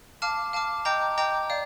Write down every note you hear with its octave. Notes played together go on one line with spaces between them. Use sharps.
F5 A5 D6 F6
F5 A5 D6 F6
D#5 G5 A#5 D6 G6
D#5 G5 A#5 D6 G6
D5 F5